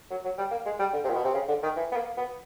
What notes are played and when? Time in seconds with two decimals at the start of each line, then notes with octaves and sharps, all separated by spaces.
0.11 F#3
0.25 F#3
0.38 G3
0.51 A#3
0.66 G#3
0.79 G3
0.93 D3
1.04 C3
1.10 A#2
1.15 B2
1.24 C3
1.34 C#3
1.48 D3
1.63 D#3
1.76 E3
1.92 B3
1.96 A#3
2.17 B3